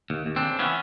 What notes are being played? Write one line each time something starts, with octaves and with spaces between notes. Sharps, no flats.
D#2
D#2
C4 D4
C#3
E3 B3 C#4